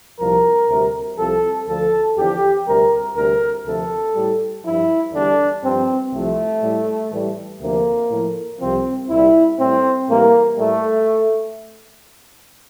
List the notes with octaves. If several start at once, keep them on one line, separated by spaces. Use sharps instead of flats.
C2 A#2 F3 A#4
D2 C3 G3
C2 C3 F3 A4
D2 D3 F3 A4
E2 D3 F3 G4
D2 C3 G3 A#4
D2 C3 G3 A#4
D2 C3 F3 A4
A2 G3
F3 E4
G2
E2 D3 G3 D4
G2 F3 C4
C2 C3 F3 A3
A2 G3
A2 E3 G3
D2 C3 F3 A#3
A2 F3
C2 C3 F3 C4
C2 A#2 G3 E4
A2 G3 C4
A2 E3 G3 A#3
A2 G3 A3